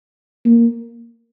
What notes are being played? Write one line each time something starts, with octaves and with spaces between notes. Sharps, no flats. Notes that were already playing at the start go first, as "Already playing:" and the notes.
A#3